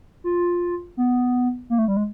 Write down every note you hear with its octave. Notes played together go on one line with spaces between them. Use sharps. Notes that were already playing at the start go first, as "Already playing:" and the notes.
F4
B3
A#3
A3
G3
G#3